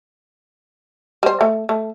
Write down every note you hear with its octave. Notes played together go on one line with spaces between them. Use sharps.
G3 C5
A3
A3